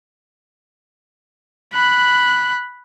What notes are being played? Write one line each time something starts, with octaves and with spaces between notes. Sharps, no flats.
B5 F#6